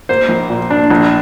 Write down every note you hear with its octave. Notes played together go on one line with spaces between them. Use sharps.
A#3 C5
A#1
A#2
D4
A#1